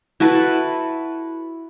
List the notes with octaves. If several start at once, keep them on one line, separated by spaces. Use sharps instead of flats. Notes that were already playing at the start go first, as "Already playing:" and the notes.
E4 F#4 A4 B4